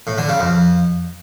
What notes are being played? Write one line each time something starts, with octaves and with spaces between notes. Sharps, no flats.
A2
D3
C#3
F2